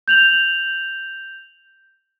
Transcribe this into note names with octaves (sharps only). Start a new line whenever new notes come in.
G6 F7 F#7